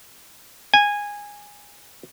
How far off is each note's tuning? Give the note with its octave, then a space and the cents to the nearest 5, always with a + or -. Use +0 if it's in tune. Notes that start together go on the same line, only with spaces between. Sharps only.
G#5 -15